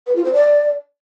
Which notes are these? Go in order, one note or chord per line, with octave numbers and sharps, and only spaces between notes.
B4
F4
C5
D5